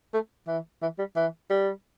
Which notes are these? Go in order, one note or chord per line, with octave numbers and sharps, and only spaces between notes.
A3
E3
E3
G3
E3
G3